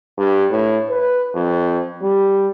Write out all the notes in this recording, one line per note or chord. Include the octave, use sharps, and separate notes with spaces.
G2
A2
B4
F2
G3